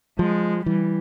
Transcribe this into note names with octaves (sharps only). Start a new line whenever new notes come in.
F3 G#3
E3 G3